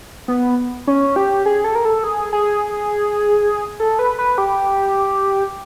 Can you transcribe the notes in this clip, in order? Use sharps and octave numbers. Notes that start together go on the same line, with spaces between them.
B3
C#4
G4
G#4
A4
A#4
A4
G#4
G#4
A4
B4
B4
G4